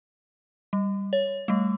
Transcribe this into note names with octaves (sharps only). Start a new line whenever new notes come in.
G3
C#5
G3 A3